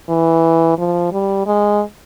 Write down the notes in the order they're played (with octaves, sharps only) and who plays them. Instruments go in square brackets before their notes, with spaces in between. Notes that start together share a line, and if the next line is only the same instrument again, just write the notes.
[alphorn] E3
F3
G3
G#3